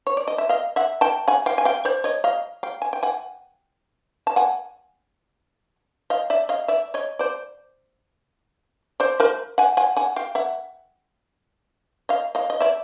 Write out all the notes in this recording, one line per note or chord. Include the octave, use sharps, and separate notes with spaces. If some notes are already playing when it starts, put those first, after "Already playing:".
C#5
D5
D#5
E5
D#5 F5
E5 F#5
G5 A5
F#5 G#5
F5 G5
G#5
F5 G5
C5 D5
C#5 D#5
D#5 F5
F5 G5
G#5
G5
F#5 G#5
A5
F#5 G#5
D#5 F5
D5 E5
D#5 F5
D5 E5
C#5 D#5
C5 D5
C5 D5
A#4 C5
F#5 G#5
F#5 G#5
F#5 G#5
F5 G5
E5 F#5
D#5 F5
D#5 F5
D#5
D5 E5